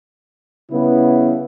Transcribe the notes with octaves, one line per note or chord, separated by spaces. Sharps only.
C#3 G3 B3 E4 B4